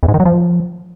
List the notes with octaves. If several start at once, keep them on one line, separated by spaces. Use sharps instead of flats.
E2
G#2
D#3
F#3
F3